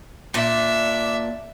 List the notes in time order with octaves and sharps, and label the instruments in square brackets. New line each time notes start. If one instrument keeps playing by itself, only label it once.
[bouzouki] A#2 D4 [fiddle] E5